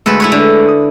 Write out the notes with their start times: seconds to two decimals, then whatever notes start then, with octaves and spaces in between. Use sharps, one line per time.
0.06 D2 G#3 A3 A4 B4
0.20 E4 B4 C#5
0.32 D3
0.68 D#6